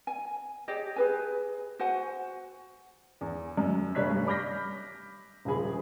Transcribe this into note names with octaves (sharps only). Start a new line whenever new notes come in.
G#5
G4 G#4 C#5 D#5
G#4 B4 G#5
F#4 C5 F#5 G#5
E2
F#2
F1 G3 D4 C#5 F#6 B6
G2
B5 D6 F6 G6 A#6 B6
D#1 C#3 F3 G#4 B5